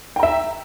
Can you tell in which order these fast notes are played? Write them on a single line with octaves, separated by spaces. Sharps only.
G5 A#5 E5